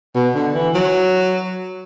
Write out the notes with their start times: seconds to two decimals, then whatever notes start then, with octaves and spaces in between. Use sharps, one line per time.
0.15 B2
0.35 D3
0.54 E3
0.75 F#3